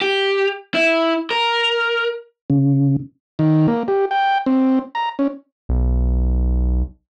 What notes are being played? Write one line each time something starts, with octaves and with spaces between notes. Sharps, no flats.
G4
E4
A#4
C#3
D#3
A#3
G4
G5
C4
A#5
C#4
B1